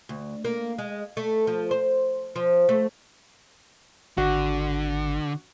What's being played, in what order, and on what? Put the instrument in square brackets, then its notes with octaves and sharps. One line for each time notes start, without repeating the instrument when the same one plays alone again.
[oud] D2
A#3
G#3
A3
F3
C5
F3
A3
[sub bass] G#1 [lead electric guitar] D3 [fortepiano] F#4